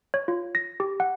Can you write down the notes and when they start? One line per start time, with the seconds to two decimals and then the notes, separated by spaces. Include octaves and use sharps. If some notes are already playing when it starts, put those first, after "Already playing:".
0.14 C#5
0.28 F4
0.55 A#6
0.80 G4
1.00 F#5